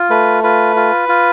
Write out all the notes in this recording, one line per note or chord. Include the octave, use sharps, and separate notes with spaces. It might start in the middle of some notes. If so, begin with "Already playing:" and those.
Already playing: F4
A3 B4
F4 B4
F4
F4